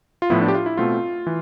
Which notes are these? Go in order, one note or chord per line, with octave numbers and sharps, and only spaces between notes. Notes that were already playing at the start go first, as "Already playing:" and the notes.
F4
A2 F3 B3 E4
D4
G4
F4
E4
B2 A3 C4 F4
E3